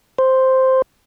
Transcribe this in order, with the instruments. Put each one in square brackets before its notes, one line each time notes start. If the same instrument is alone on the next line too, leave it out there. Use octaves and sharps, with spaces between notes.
[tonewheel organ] C5